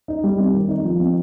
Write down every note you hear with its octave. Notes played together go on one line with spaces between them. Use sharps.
D#4
G3
C4
D#3
D#4
F3
C4